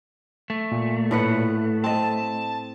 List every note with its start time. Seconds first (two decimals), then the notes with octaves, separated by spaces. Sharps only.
0.50 A3
0.72 A#2
1.11 A2 B4 F#5
1.84 C4 D#5 A5